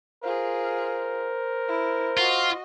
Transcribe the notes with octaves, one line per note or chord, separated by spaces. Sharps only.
F4 G#4 A#4 C5
E4
F4 F#4 D#5